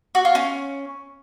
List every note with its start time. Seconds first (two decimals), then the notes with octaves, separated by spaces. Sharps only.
0.15 F#4
0.25 F4
0.35 C#4